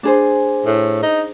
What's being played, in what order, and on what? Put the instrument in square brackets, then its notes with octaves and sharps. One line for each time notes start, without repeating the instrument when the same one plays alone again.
[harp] D4 G#4 C5
[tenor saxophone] A2
D#4